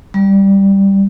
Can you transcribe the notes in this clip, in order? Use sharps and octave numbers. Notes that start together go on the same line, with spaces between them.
G3